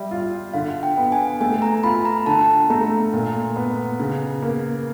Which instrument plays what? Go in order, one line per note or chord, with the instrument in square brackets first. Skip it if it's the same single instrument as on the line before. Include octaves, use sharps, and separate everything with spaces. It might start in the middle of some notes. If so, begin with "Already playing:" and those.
Already playing: [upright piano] G3 [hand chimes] E5
[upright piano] F4
[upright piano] D3 [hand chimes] F5
[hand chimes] G5
[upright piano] B3
[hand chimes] G#5
[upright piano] A3 [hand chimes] G#5
[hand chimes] A#5
[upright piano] F4 [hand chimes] B5
[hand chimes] A#5
[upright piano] D3 [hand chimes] A5
[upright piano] A3 [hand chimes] A#5
[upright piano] A#2
B3
C#3
A#3